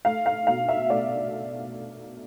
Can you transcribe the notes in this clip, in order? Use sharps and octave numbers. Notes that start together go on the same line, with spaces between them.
A3 F5
F5
B2 F5
E5
A3 D5